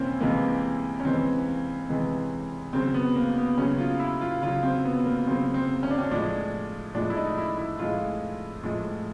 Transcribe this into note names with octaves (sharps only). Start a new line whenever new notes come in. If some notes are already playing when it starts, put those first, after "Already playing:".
Already playing: C3 E3 A#3 C4 C#4 E4
C3 E3 G#3 A#3
C#4
C3 E3 G#3 C4
C3 E3 G#3
C#3 F#3 C4
B3
A#3
B3
C#3 F#3 C#4
F4
E4
F4
C#3 F#3 F4
C4
B3
A#3
C#3 F#3 C4
C4
C#4
D4
C#4
A2 F3 G#3 D4
A2 F3 G#3 D4
E4
D#4
E4
E4
A2 F3 G#3 F4
A2 F3 G#3